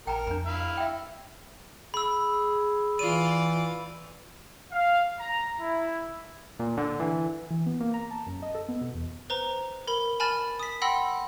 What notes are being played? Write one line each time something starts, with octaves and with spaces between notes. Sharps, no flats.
A#1 A#4 G5 A5 A#5
F2 D4 A#5
E4 F5
E5 G5
G#4 B5 E6
E3 F4 D5 D#7
F5
A#5
E4
A#2
D3
E3
E3
B3
A#3
A#5
A5
F#2
D#5
A4
B3
B2
E2
B4 C5 A#5
A#4 B5 G7
G#5 A5 B5 F6 A6
D#6 B6
F#5 G5 B5 C6 E6 A#6